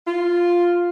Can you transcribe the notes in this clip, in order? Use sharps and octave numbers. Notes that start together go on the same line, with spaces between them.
F4